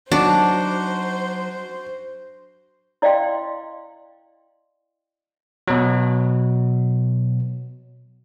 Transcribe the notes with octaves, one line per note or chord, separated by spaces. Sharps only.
F#3 D4 D#4 F#4 C5
E4 D5 D#5 F5 G5 C6
B2 F#3